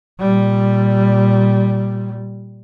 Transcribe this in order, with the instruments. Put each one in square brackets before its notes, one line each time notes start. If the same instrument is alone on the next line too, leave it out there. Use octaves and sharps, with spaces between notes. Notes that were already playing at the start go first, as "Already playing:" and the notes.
[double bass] A#2 G3